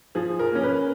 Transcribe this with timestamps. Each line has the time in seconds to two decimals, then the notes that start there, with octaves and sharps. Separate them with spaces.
0.15 F3 G#4
0.39 A#4
0.52 A#3 C#4
0.63 B4